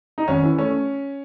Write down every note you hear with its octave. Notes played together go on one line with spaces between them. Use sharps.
D#4
G#1 C#4
E3
A3 C#4